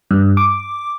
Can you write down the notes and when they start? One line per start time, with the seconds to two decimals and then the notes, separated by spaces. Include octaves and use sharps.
0.11 G2
0.37 D6